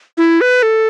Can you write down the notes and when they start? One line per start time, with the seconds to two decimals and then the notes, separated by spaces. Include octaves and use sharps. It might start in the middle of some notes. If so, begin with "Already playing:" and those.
0.18 E4
0.41 B4
0.63 A4